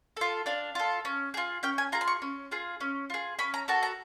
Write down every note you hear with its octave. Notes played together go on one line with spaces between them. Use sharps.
F4 A4
D4 F5
F4 A4
C#4
F4 G#4
C#4 G5
G#5
F4 G#4 A#5
C6
C#6
C#4
F4 G#4
C#4
F4 G#4
C#4 B5
A#5
F#4 A4 A5
A#5